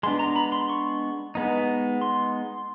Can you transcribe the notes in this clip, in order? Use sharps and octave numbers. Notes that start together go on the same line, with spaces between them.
G#3 B3 D4 C6
A#5
B5
C6
C#6
G#3 B3 D#4
C6